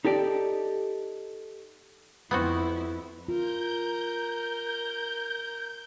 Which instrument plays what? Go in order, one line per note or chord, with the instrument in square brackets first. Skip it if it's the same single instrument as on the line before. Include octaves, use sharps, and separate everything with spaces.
[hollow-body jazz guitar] D#4 G4 A4 D5
[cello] F2 E4 [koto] B3 C4 F#4
[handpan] F4 [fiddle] A#4 [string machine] G6